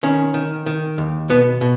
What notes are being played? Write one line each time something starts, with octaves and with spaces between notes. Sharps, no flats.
D#3 C#4
D#3
D#3
D#2
B2 B3
B2